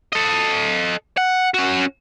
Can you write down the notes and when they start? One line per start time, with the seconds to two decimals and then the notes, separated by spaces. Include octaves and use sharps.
0.13 A4 D#5
1.18 F#5
1.54 C#4 F#4